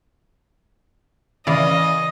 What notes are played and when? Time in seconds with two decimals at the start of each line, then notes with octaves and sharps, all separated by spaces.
1.47 C#3 E3 D5 D#5 F5